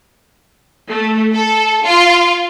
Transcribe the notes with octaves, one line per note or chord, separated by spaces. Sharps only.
A3
A4
F4